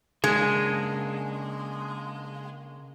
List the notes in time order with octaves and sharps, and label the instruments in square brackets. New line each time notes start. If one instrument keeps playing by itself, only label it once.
[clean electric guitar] C#3 A#3 D4 [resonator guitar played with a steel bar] G#3